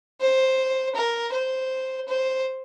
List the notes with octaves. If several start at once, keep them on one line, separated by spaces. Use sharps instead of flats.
C5
A#4
C5
C5